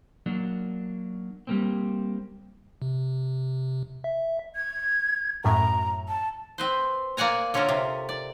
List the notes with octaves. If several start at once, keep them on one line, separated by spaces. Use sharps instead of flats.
F#3 A#3 D4
G3 A#3 C4
C3
E5
G#6
F#2 A2 A#5
A5
C4 B4 C5
A#3 D5 F#5 G#5 A#5
D3 C#4 F4 A4 A#4
C3
D5